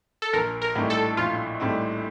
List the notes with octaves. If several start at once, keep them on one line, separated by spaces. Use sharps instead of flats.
A4
A#1 A#4
A#4
A2 G3 C4 D#4
A4
A#1 F4
A2 G3 C4 D#4